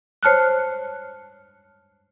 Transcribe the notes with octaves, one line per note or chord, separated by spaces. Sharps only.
C5 C#5 A5 F6 F#6